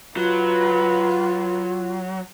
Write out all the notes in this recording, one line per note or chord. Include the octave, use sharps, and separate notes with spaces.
F#3 F4 B4